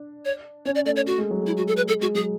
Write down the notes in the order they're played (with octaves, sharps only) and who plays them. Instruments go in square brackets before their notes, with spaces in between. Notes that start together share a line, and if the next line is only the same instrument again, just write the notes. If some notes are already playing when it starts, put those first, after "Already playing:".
Already playing: [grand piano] D4
[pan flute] C#5
[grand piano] C#4 [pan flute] C#5
[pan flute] D5
[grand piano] A3 [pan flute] D5
[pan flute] C#5
[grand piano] A3 [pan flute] F#4
[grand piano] G#3
F#3
[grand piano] G#3 [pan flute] E4
[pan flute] F#4
A4
B4
[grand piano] G#3 [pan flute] A4
[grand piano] G#3 [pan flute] F#4
[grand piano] F#3 [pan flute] G#4